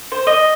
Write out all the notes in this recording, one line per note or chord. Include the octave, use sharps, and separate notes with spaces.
C5
D#5